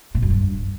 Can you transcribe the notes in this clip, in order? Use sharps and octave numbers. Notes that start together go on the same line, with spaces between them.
A#2
F#2
G2